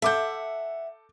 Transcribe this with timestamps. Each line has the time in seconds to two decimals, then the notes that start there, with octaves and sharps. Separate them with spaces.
0.02 A4 E5 F#5 D6 G6